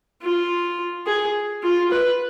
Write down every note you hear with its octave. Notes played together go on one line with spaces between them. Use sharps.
F4
G#4
F4
B4